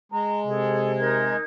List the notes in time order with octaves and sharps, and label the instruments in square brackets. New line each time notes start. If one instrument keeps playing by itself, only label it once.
[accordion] G#3 [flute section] A#5
[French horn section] C3 [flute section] G#4 A4
[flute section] D#4 A#4 G#6